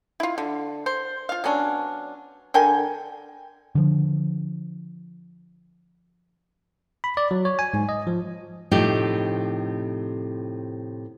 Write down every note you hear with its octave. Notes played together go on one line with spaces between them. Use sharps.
E4 F4
D3
C5
F4 F5
F#3 B3 C#4 D4
D3 A#4 G5 G#5
D3 F3
B5
D5
F#3
C#5
G#5
G#2
D#5
F3
A2 C3 F3 A3 D#4 G4